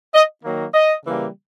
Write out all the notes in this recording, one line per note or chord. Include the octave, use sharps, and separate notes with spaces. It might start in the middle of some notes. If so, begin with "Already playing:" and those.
D#5
D#3 F#3 A#3
D#5
C#3 E3 G3 A#3